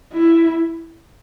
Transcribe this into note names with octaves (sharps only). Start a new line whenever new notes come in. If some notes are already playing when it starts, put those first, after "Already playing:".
E4